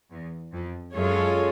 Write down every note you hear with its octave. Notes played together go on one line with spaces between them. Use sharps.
E2
F2
F#2 G#3 C#4 F4 A4 C#5